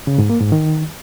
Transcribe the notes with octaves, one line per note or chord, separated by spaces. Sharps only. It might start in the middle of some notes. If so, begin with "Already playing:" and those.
C#3
G#2
A#3
G#2
D#3